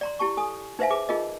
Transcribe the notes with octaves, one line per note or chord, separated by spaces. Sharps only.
D5 A#5 C6
E4 G4 A5 C#6
A4 G#5 D#6
D#4 B4 C5 E5 F5 G#5
G#4 B4 E5 D6
D#4 F4 G#4 A#4 D#5